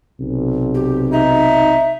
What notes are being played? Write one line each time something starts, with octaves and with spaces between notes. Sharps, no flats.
B1 C3
G4
D#4 E5